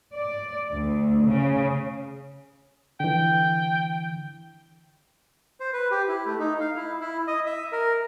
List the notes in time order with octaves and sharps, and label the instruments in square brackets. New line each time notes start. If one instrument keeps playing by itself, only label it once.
[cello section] D5
D2
C#3
[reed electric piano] D3 E3 [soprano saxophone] G5
[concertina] C5
B4
G4
E4
A3
D#4
F5
E4
E4
D#5
E5
A#4